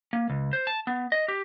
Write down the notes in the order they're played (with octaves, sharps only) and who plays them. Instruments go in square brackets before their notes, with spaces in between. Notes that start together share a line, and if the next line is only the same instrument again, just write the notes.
[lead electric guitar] A#3
C#2
C5
A5
B3
D#5
G4